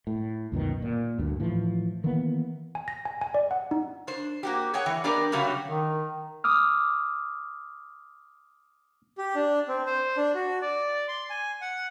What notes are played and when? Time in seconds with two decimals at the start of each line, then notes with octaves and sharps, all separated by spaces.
0.07 A2
0.52 C#2 F#2 B2 D#3
0.82 A#2
1.18 D2 G2
1.40 A2 E3 F3
2.04 D#3 E3 A#3 B3
2.75 G#5
2.88 A#6
3.05 G#5
3.21 G#5
3.34 D5
3.51 F#5
3.71 D#4
4.07 D4 C5
4.43 A#3 F#4 G4
4.74 G#4 C#5 F#5 G5
4.86 E3
5.04 B3 D4 G4 A#4 D5
5.32 C#3 F#3 G3 A3 D4
5.67 D#3
6.44 D6 D#6 F6
9.18 G4
9.35 D4
9.68 C4
9.86 C5
10.17 D4
10.35 F#4
10.62 D5
11.08 C6
11.30 G#5
11.61 F#5